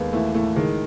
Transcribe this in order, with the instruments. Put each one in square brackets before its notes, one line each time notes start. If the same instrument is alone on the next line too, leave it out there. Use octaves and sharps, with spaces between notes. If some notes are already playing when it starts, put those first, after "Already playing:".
Already playing: [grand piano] D#2 [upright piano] G#3 B3
[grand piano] E3 [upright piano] A3
[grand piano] A2 [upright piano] A3
[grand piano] D#3 [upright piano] G#3